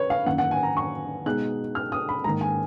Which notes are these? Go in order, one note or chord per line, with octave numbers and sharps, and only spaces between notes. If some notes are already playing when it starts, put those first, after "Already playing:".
Already playing: B4 C#5
F5
F#2 D#3 A#3 F#5
F#5
G#5
A#5
C#6
B2 G#3 D#4 F#6
F6
D#6
B5
G#2 D#3 A#3 A#5
G#5